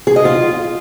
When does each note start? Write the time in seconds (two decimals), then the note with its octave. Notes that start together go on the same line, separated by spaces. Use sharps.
0.07 G#4
0.16 D#5
0.25 F4